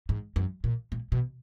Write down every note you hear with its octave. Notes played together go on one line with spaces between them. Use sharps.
G#2
F#2
A#2
A#2
B2